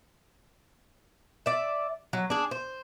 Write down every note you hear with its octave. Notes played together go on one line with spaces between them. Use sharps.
D5 E5
F#3
D4 G#4
C5